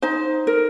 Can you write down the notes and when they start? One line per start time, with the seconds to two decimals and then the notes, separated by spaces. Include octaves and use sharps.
0.02 D#4 C5
0.47 A#4